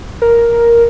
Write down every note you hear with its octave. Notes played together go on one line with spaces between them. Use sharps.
A#4